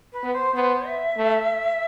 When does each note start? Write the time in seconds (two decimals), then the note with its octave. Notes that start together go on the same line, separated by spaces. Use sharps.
0.13 B4
0.23 B3
0.33 C5
0.54 B3 C5
0.87 E5
1.18 A3